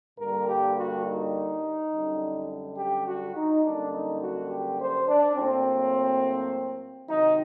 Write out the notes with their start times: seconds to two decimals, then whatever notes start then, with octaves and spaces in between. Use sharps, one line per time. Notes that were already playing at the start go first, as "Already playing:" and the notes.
0.18 G2 D3 G3 A#3 A#4
0.47 G4
0.76 F#4
1.05 D#4
1.91 F#2 D3 G3
2.77 G4
3.06 F#4
3.34 D#4
3.64 F#2 D3 G3 A#3 D4
3.92 D#4
4.21 F#4
4.49 G4
4.78 C5
5.08 D4
5.36 A2 F#3 A#3 C4
7.09 C3 D#3 F#3 D#4